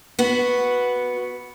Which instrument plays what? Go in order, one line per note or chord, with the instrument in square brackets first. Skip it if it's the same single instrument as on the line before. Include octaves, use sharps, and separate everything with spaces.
[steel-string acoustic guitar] B3 F#4